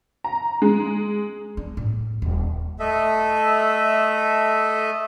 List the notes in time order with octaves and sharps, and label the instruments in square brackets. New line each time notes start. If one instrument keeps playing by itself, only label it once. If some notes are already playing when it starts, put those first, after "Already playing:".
[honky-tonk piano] A#5
G#3
[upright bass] D4
A2
D#1
[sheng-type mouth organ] A3 A4 D#5 E5